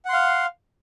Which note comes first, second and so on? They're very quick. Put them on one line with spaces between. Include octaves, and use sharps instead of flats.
F#5 C6 F5